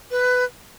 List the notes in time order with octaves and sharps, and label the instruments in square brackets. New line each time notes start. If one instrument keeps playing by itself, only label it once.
[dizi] B4